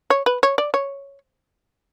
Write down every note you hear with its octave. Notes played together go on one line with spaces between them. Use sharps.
C#5
B4
C#5
D5
C#5